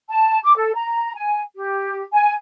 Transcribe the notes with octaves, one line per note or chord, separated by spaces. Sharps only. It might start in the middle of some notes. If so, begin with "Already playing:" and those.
A5
D6
A4
A#5
G#5
G4
G#5